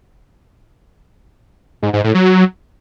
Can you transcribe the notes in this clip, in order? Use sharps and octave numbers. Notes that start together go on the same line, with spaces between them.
G#2
G#2
A2
F#3